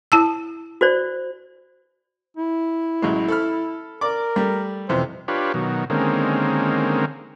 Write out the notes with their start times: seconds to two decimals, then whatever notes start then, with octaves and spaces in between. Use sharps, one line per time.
0.12 E4 A5 E6
0.81 F#4 C5 D5
2.37 E4
3.02 A1 F#3 G#3
3.28 A4 B5 F6
4.01 A#4 D5 D6
4.36 G3 A3
4.89 F2 C3 E3 C5
5.28 D4 F4 G4 B4 C#5
5.54 B2 D#3 F#3
5.90 D3 D#3 G#3 A#3 C4 C#4